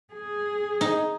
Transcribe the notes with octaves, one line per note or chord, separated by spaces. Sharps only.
G#4
D#4